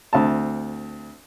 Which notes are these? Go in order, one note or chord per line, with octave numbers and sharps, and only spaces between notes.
D2 C4 A5